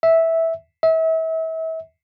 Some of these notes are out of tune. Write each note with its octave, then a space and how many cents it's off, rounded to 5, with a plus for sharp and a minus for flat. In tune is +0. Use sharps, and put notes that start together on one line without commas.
E5 -10
E5 -35